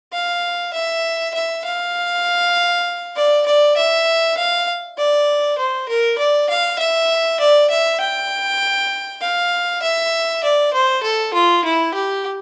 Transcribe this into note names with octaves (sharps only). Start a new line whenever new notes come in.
F5
E5
E5
F5
D5
D5
E5
F5
D5
C5
A#4
D5
F5
E5
D5
E5
G5
F5
E5
D5
C5
A4
F4
E4
G4